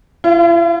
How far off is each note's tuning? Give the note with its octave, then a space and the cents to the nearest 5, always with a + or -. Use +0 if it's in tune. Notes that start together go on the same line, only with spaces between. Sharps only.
E4 +45 F5 +5